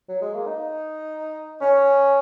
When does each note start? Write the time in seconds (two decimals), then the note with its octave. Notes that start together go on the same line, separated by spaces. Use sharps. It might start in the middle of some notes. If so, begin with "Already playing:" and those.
0.09 F#3
0.22 G#3
0.34 A#3
0.47 D#4
1.61 C#4